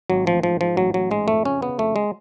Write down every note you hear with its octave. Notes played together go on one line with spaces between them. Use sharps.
G#1 F#3
A1 F3
G#2 F3
G#2 F3
A1 F#3
A1 F#3
G#2 G#3
F2 A3
C#3 C#4
C#3 B3
F2 A3
G#3